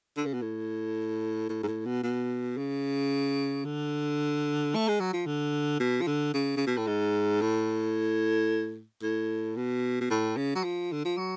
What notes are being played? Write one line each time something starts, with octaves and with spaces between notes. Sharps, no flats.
D3
C#3
B2
A2
A2
G#2
A2
B2
B2
C#3
D3
A3
G#3
F#3
F3
D3
B2
F3
D3
C#3
C#3
B2
A2
G#2
A2
A2
B2
B2
A2
C#3
F#3
F3
D3
F3
F#3